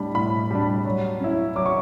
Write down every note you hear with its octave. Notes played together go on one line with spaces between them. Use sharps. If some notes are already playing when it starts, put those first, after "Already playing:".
Already playing: A2 G3 D4 B5
A2 B5
G3 D4
F#3
C#4 E4
F#3 D6
C#6